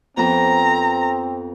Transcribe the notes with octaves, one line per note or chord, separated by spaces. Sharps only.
F2 B3 C4 A4 A#5